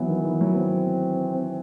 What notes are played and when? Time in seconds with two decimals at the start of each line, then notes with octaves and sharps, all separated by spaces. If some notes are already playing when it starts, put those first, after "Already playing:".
Already playing: E3 F#3 B3
0.08 D#3
0.24 E3
0.41 F#3
0.57 C4